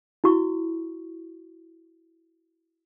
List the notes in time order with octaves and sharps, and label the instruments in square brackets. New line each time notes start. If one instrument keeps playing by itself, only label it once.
[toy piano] E4 F#4 C#6